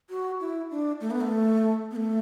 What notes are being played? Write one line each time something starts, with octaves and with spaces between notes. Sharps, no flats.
F#4
E4
D4
A3
B3
A3
B3
A3